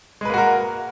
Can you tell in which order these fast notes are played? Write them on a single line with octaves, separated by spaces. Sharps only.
G#3 B4 A#3 F#4 A#4